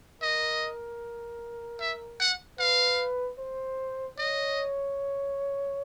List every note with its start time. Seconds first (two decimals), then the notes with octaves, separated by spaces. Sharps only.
0.22 A#4 D#5
1.80 E5
2.20 F#5
2.59 B4 F5
3.38 C5
4.18 C#5 D#5